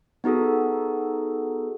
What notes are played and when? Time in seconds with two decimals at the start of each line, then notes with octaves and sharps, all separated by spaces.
0.24 B3 D#4 F#4 G#4 A4